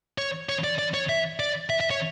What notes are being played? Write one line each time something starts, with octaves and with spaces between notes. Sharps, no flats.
C#5
C#5
D5
D5
C#5
E5
D5
E5
E5
C#5